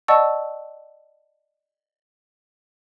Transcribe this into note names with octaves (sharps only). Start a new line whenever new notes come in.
D5 D#5 F#5 A5 C#6 E6